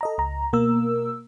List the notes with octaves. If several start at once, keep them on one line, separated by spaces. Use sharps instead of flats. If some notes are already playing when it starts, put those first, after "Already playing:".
A4 D#5 A#5
C#2 A#5
B2 A#3 A#4 E6